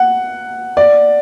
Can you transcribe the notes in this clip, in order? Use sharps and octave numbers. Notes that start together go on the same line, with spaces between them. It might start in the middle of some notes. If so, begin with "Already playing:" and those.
Already playing: F#5
D5